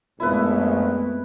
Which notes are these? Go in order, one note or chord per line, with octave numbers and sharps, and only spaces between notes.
A#1 F#2 G#3 A3 B3 C4 E4 B4